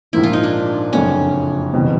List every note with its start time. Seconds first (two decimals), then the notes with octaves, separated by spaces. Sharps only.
0.13 A#1 G#2 F3 A#3 E4
0.23 F4
0.33 D#4
0.43 D4
0.93 F#1 F2 D3 F#3 C#4
1.73 F#1 E2 B2 G3 C4